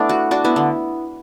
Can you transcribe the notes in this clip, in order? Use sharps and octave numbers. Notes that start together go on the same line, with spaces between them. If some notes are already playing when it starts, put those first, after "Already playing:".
Already playing: A3 B3 D4 E4
F#4
D4 F#4
B3 E4
D3